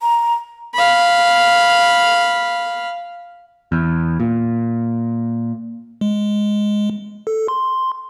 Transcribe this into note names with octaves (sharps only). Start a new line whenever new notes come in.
A#5
F5 B5
E2
A#2
G#3
A4
C6